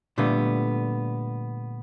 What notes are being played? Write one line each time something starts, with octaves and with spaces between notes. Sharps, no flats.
A#2 D3 G3 A3 B3